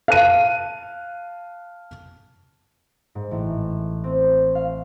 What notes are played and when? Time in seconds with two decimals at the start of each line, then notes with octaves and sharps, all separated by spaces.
0.08 F5 A5 F#6 D#7
3.15 G#2
3.31 A1
4.04 C4
4.55 F5